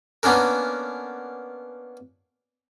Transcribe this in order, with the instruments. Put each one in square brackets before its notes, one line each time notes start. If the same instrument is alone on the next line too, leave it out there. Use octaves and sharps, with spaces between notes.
[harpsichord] A#3 B3 C#4 D4 A#4